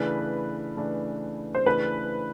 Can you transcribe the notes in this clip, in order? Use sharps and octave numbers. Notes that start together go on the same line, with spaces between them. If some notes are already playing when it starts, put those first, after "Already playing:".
Already playing: C#3 E3 A3 D4 B4
C#3 E3 A3 D4
C5
C#3 E3 A3 D4 B4